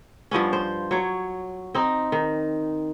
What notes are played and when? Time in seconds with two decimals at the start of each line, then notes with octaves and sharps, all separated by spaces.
0.31 G2 F3 B3 C#4
0.53 C5
0.91 F#3 C#5
1.75 C4 D#4
2.12 D#3